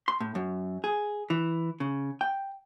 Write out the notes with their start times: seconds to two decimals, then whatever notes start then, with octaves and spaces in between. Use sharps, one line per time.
0.08 C6
0.20 A2
0.35 F#2
0.84 G#4
1.30 E3
1.80 C#3
2.21 G5